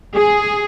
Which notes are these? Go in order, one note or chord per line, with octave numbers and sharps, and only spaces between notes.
G#4